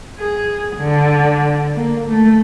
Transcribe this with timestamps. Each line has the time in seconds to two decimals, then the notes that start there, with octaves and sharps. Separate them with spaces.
0.19 G#4
0.76 D3
1.75 A#3
2.09 A3